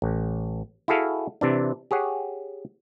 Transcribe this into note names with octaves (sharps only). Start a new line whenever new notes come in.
A1
E4 F#4 G#4 A4 F5
C3 E3 D4
G4 G#4 C#5 F#5